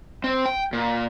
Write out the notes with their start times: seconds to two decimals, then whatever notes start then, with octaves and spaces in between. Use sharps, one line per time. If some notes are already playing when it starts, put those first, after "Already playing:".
0.24 C4
0.46 G5
0.73 A#2